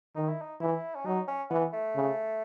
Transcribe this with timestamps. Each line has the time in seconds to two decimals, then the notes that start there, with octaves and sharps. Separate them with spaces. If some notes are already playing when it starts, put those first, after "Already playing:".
0.15 D#3 D#4
0.29 E4
0.41 D#4
0.60 E3 E4
0.95 C#4
1.05 F#3 D#4
1.28 C#4
1.50 E3 B3
1.73 A3
1.96 C#3